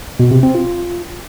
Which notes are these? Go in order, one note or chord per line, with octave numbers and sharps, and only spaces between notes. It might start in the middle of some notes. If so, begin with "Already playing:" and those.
B2
C3
C4
F4